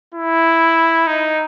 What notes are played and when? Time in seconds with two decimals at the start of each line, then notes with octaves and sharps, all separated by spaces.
0.14 E4
1.07 D#4